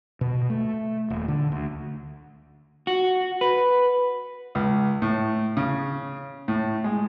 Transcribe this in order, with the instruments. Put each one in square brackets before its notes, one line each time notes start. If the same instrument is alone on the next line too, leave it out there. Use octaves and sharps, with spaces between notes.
[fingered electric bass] B2
A3
D#1
D3
D2
[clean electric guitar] F#4
B4
[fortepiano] C#2
A2
C#3
A2
G#3